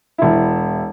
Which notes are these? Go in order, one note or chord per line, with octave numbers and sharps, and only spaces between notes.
E1 E4